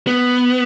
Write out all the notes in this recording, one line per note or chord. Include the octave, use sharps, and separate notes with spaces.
B3